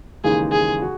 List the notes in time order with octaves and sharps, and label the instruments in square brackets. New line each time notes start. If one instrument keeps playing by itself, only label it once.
[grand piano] D#2 C#3 E3 G#3 D#4 [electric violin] G#4
[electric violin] G#4
[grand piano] F#4